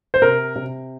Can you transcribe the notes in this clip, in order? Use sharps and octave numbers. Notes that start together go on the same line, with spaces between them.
C5
C3 A#4
C3